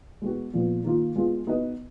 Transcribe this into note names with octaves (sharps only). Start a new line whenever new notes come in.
G#3 B3 F#4
A#2 F3 B3
D#3 A#3 F4
G#3 B3 F4
B3 D#4 F#4 B4 D#5